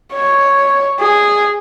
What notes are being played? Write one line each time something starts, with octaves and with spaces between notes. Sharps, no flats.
C#5
G#4